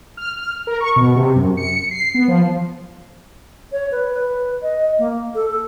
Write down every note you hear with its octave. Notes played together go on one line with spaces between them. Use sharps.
F6
F6
A#4
C#6
B2
C3
F#2
C#7
C7
B3
F3
C#5
B4
B4
D#5
A#3
A4
A4